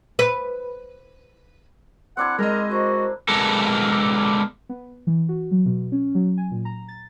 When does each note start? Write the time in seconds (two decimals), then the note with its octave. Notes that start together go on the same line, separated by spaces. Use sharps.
0.19 B4
2.17 C4 D4 E4 F#5
2.39 G#3 A#4 D#5
2.70 F#4 A#4 C5 A#5
3.28 D3 G#3 B3 A4 A#4
4.69 B3
5.07 E3
5.29 F#4
5.51 F#3
5.66 B2
5.92 C#4
6.15 F#3
6.38 G#5
6.51 A#2
6.65 A#5
6.88 A6